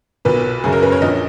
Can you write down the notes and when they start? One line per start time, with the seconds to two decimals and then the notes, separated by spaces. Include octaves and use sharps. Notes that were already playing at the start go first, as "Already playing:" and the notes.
0.25 B1 A#2 B4
0.64 F#1 F#2 C#3 G#4
0.73 A#4
0.83 B4
0.92 C#5
1.02 A#1 A#2 D#5